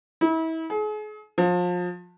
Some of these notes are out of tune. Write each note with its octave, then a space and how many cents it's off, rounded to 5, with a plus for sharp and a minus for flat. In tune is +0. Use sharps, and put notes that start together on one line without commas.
E4 -35
G#4 +40
F3 +30